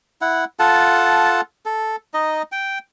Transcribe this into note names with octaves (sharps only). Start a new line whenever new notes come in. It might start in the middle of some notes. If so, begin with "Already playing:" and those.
E4 F#5
F4 A4 F#5 A5
A4
D#4 D#5
G5